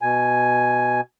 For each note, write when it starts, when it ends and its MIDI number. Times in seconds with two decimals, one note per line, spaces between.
0.02 1.01 47
0.02 1.01 80